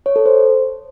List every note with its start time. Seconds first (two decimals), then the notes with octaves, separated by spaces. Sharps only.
0.06 C#5
0.16 A4
0.26 C5